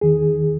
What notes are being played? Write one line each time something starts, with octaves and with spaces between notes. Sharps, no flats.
E2 D#3 G#4